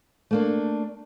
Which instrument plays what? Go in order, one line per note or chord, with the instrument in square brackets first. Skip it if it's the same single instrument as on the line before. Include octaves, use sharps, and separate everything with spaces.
[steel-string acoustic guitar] A3 A#3 D4